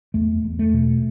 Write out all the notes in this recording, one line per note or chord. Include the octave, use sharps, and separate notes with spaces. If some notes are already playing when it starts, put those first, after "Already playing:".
E2 A3
E2
A3
B2